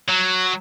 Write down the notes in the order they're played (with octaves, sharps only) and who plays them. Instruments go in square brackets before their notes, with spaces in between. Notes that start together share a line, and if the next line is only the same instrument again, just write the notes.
[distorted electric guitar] F#3